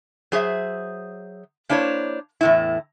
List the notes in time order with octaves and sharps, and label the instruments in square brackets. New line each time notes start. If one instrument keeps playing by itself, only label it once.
[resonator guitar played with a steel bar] F#3 G#4 C5 E5
A#3 D4 E4 C5 C#5
E2 A2 E4